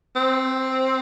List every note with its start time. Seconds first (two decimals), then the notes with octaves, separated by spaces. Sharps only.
0.16 C4